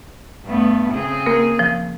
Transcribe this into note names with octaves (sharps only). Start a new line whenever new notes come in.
G2 A3 B3
C#3 C4 G#4
A#3 A#4
F3